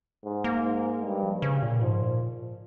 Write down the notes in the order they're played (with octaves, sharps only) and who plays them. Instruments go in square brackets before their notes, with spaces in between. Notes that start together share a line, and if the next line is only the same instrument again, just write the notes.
[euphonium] G#2
[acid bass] A#3
[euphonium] G#2
[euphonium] G2 [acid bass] G#3
[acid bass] F3
C#3
A#2
[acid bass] G#2 [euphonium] F3
[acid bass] A#2